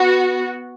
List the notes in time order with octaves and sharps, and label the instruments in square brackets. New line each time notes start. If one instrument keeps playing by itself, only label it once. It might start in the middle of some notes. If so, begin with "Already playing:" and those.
Already playing: [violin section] B3 F#4